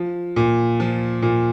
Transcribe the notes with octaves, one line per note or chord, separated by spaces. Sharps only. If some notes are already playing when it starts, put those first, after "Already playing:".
Already playing: F3
A#2
F3
A#2